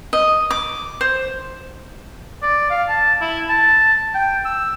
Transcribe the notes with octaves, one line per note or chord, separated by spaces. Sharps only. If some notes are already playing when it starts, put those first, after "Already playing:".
D#5
D6
C5
D5
F5
A5
E4
A5
G5
E6